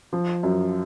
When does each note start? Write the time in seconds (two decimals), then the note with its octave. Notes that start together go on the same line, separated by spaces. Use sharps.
0.13 F3
0.43 F#2